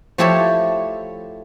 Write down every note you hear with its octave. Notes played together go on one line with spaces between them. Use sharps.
F3 A3 E4 G4 A4 C#5